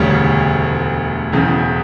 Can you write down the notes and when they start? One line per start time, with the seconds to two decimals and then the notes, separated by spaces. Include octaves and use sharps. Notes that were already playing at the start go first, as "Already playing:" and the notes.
Already playing: E1 D2 C#3 G3 C#4
1.32 E1 E2 C#3